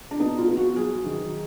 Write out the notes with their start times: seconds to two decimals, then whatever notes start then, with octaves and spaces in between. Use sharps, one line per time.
0.11 D4
0.20 B3 D#4
0.38 F4
0.48 B3
0.57 F#4
0.76 F#3 G#4
1.06 D#3